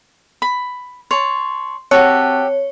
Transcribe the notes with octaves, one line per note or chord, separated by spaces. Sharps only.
B5
C#5 A5 C6
C4 F#4 G4 C#5 E5 A5 F#6